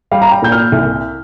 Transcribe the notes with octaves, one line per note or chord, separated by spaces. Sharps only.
G3 F5
A#5
G5
A#2 G6
F6
C2